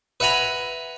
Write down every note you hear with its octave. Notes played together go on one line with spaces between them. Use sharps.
B4 E5 F#5 G#5 A#5 B5